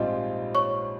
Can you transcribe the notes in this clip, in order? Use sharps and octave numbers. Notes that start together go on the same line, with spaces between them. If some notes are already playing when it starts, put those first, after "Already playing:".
Already playing: A#1 G#2 G3 C4 F4 D#5
C#5 C#6